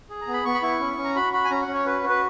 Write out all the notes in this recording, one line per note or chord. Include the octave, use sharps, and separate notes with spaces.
G#4
A#5
B3
B5
B3 C#6
B5
E4 C#6
C#4
C#4
A#5
F#4 B5
F#4 B5
G#5
C#4 A#5
F#5
C#4
C#5
F#4 B4
F#4
B4